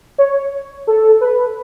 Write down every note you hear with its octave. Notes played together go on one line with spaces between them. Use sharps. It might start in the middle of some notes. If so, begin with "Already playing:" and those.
C#5
A4
B4